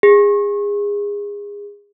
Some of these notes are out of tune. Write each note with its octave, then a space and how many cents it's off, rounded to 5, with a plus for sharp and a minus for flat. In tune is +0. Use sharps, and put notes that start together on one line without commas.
G#4 -25